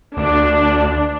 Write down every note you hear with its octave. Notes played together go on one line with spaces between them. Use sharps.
D2 D4